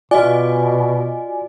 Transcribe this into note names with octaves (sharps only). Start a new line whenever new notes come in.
B2 F4 F#4 D5 D#5 G#5